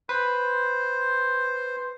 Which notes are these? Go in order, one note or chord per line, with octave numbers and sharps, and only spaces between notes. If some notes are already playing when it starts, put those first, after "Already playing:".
B4 C5